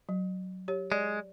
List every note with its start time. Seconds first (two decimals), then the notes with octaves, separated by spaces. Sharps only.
0.09 F#3
0.68 G4 C#5
0.92 G#3 D5